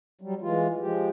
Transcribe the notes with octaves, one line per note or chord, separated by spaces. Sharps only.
F#3 G3
E3 G#3 F4
F3 G#3 G4